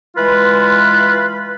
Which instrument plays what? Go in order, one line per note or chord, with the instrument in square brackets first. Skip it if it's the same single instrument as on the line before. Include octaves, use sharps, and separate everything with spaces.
[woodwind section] E3 G#3 F4 B4